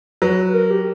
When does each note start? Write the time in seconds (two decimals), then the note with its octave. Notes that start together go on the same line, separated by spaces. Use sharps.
0.22 F#3 B4
0.54 A#4
0.71 G4